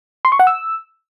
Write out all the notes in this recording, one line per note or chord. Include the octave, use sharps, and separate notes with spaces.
C6
C#6
F#5
E6